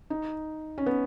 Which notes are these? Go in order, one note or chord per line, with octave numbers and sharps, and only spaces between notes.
D#4
C#4
B3